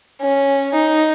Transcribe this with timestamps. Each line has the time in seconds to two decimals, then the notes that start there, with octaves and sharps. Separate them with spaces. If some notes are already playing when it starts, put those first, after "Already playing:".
0.21 C#4
0.74 D#4